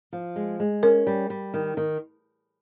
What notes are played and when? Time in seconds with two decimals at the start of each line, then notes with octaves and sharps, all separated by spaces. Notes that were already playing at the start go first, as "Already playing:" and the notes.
0.13 F3
0.36 G#3
0.60 G#3
0.83 C#4 A#4
1.07 G3
1.30 G3
1.54 D#3
1.77 D#3